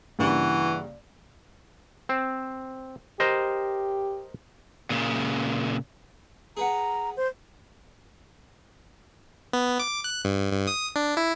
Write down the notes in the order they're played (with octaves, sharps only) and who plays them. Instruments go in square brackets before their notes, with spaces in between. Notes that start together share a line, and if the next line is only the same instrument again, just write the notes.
[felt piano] G2 C#3 A#3 [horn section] E3 F#4 B4
[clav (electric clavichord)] C4
[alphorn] G4 [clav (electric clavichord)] A#4 C5 D#5
[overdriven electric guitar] A#2 C#3
[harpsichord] G#4 B4 F#5 [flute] A#5
[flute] C5
[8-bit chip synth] B3
D6
F#6
G2
G2
D#6
D4
E4